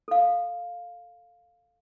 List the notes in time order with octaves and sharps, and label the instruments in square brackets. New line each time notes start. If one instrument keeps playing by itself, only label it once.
[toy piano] A4 F5